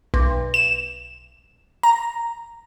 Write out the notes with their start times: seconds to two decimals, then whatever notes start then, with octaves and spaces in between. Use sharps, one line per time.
0.14 B1
0.54 E7
1.83 A#5